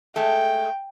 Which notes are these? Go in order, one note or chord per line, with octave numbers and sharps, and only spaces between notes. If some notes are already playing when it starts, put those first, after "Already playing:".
G#3 A3 G5